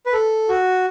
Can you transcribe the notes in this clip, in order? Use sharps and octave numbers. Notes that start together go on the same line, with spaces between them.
B4
A4
F#4